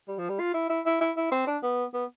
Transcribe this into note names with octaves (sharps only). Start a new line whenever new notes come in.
G3
F3
G3
F4
E4
E4
E4
E4
E4
C4
D4
B3
B3